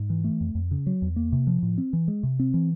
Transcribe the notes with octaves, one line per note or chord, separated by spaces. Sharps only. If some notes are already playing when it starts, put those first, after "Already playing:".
Already playing: G#2
E3
A3
F2
F2
C#3
F#3
E2
A#3
C3
F3
A2
C4
E3
G#3
C3
C4
E3